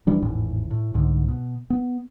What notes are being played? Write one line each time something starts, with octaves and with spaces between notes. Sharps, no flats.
D#1 E3 G3 D4
G#1 E2 A2
A2
C2 G#2 D3
B2
B3